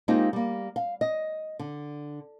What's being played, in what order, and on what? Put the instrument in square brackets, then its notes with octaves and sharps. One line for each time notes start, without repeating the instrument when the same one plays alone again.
[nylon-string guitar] G#3 A#3 C4 D#4 F4 G4
G3 A#3
F5
D#5
D3